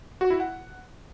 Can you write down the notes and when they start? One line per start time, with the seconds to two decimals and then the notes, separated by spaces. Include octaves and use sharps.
0.21 F#4
0.30 E4
0.40 F#5